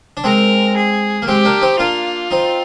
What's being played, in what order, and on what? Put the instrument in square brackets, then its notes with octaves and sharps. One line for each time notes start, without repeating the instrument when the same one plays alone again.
[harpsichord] D4
[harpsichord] G#3 C4 [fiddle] A#4
[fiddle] G#4
[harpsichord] A#3
[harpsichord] G#3 C4 [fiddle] G4
[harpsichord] A#3 D4
C4 D#4
[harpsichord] A#3 D4 [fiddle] F4
[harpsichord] C4 D#4